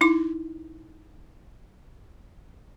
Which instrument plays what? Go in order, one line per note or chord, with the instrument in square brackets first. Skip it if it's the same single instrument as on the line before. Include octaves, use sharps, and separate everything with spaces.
[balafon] D#4 E4 D6